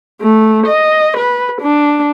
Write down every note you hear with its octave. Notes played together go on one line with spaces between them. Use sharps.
A3
D#5
B4
D4